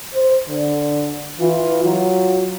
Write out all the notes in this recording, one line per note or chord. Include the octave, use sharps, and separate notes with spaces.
C5
D3
E3 F4
F#3 F4